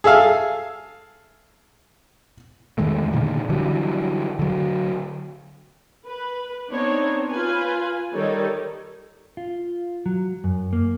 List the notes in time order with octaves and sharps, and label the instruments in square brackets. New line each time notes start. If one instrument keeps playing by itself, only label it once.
[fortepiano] G#4 A4 E5 F5
[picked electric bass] E2 D#3 G#3 A3
A#2 D3 D#3
D3 E3 F#3 G3
D3 F#3
[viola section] B4
B3 C4 D4 D#4 C5 C#5
F4 B4 G#5
D#3 G3 D#4 A4 C#5
[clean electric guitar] F4
F#3
F#2
A#3